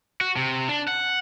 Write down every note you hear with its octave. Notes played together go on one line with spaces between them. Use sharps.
F#4
C3
D4
F#5